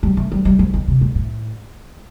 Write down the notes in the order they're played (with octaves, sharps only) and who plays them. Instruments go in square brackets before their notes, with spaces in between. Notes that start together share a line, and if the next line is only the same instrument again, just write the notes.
[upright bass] G3
A3
G3
G3
F3
D#3
C3
A#2
A2